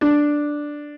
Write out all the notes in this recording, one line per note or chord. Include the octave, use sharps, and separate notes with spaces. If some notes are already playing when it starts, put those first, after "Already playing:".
D4